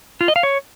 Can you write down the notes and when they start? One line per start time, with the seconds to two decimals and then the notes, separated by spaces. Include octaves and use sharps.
0.21 F4
0.28 D#5
0.36 F5
0.43 C#5